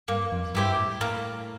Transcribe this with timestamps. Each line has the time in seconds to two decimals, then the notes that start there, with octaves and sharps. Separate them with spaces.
0.08 G2 A#3
0.32 F2
0.54 G2 E4 G4 C5
0.77 A2
1.00 A2 A#3